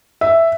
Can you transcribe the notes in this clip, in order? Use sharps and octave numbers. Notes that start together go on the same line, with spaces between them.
E5